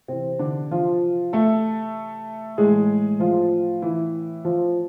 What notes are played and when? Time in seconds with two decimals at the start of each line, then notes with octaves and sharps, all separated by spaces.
0.08 C3 E3 C4
0.39 D3 D4
0.71 F3 F4
1.33 A3 A4
2.58 A2 E3 G#3 G#4
3.20 F3 F4
3.82 E3 E4
4.44 F3 F4